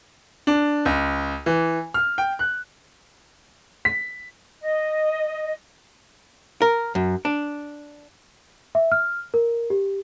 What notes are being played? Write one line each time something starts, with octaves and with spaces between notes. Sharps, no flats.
D4
C#2
E3
F6
G5
F#6
B6
D#5
A#4
F#2
D4
E5
F6
A#4
G4